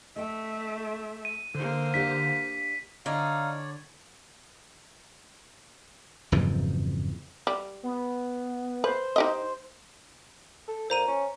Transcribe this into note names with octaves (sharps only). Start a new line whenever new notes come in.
A3 D#5 E5 G5
D#7
D3 A#3 C5
D4 G4 F5 B6
D3 D#4 C#5 D5 F5
F#1 F2 G#2 E3
G3
B3
B4 C5
D#4 G4 D#5
A4
A#2 C5 A#5 D#7
C#4